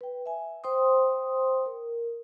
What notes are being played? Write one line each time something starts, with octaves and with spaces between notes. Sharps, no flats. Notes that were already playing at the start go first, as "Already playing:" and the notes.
B4 G5
E5 G#5
C5 G5 C6 D#6
A#4